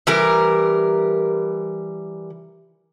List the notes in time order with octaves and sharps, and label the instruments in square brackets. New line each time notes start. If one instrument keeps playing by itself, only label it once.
[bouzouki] E3 G3 A#4